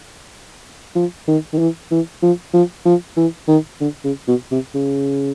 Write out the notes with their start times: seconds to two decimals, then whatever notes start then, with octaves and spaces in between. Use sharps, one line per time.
0.96 F3
1.28 D#3
1.53 D#3
1.59 E3
1.91 E3
2.22 F3
2.53 F3
2.86 F3
3.17 E3
3.48 D#3
3.81 D3
4.05 C#3
4.28 B2
4.52 C3
4.75 C#3